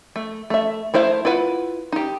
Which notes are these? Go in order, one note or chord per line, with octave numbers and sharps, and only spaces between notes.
A3
A3 E5
A3 E4 C5 E5 F5
E4 F4 B4 F#5
D#4 G4